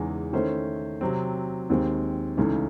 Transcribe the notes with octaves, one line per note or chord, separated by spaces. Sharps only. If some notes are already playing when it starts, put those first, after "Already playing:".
Already playing: E2 C#3 E3 G#3 D#4
D#3 A3 C#4 E4 C5
C3 F#3 C4
D#2 D#3 G#3 C4
C#2 C#3 E3 A3 D#4